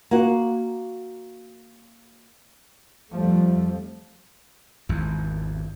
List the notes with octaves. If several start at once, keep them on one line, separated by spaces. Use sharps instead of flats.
A#3 F#4
F2 F3 G3 A3
G#1 E2